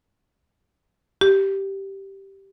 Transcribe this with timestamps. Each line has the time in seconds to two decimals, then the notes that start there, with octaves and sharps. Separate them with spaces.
1.21 G4